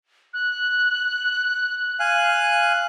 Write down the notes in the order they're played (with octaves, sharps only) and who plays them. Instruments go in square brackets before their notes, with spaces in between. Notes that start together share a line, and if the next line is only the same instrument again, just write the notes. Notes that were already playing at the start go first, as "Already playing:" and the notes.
[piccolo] F#6
[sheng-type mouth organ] F5 G#5 F#6